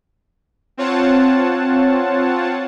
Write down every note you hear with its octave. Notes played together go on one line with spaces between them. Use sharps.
C4 F4 C#5 F#5 A5